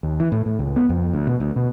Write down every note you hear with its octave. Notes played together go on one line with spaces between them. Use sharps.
D#2
E3
A2
A2
C#2
B3
F2
D2
B2
D2
B2